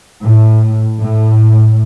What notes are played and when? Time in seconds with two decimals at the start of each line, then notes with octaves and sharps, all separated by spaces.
0.23 A2
1.02 A2